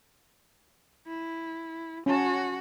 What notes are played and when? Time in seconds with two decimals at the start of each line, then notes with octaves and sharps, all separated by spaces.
1.07 E4
2.06 C#4 F#4 A5